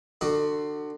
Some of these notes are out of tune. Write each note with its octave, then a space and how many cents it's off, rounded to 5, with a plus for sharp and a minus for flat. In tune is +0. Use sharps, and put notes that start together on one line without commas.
D3 +30 F#4 +15